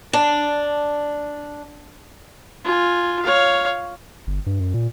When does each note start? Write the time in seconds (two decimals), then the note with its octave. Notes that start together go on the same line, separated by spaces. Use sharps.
0.13 D4 D5 A5
2.65 F4 G#5
3.22 C#5 F5
4.27 G1
4.46 G2
4.60 F#2
4.74 A#2